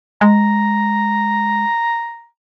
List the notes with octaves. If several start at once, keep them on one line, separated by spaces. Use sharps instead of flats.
G#3 A#5